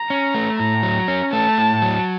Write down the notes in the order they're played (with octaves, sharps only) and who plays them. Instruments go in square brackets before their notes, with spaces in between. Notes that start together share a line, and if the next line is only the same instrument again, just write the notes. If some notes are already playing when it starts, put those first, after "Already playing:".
Already playing: [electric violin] A#5
[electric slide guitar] C#4
A3
[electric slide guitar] A2 [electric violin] A#5
[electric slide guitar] F#3
C#4
[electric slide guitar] A3 [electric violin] A5
[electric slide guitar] A2
F#3